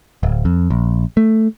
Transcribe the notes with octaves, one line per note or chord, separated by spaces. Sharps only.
D1
F2
A#1
A3